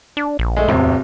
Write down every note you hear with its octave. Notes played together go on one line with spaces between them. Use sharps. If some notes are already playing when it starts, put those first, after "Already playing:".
D4
A#1
G#3 A3
D1 E2 C3